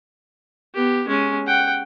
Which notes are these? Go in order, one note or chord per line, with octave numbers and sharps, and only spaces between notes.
B3 G4
G#3 C#4
F#5 G5